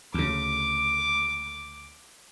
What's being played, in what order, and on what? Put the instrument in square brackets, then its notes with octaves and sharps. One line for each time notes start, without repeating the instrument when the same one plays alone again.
[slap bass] D2 C#3 [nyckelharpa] D6